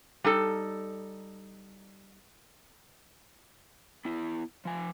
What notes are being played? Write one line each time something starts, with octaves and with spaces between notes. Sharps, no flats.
G3 D#4 A4
B3 E4
F3 G#5